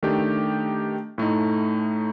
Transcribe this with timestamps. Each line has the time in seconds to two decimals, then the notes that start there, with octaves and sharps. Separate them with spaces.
0.02 D#3 A3 D4 G4
1.18 A2 A3 D#4